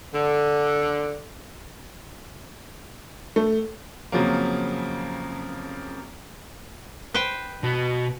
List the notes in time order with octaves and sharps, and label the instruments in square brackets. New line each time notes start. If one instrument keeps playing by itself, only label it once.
[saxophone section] D3
[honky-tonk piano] A3
[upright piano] F2 C#3 F3 F#3 A#3
[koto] B4 C5 G5
[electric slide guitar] B2 F#4